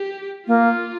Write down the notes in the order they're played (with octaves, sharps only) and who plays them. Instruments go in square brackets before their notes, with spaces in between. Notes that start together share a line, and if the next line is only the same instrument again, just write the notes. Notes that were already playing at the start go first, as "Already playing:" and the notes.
Already playing: [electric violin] G4
[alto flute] A#3 [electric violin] F4